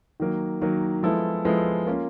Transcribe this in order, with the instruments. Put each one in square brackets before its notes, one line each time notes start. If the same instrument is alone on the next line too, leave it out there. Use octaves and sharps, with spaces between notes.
[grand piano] D#3 F#3 A#3
D#3 F#3 A#3
F3 G#3 B3 E4 A4
F3 G#3 B3 E4 A4
A#3 C#4 F4